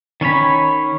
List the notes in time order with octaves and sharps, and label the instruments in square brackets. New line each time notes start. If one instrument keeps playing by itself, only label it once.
[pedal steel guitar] D#3 C#4 C#5 B5